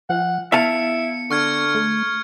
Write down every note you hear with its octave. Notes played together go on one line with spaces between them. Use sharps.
F3 F#5
B3 E4 E5 F5 A5 C#7
D3 C#6 F6 G#6
A3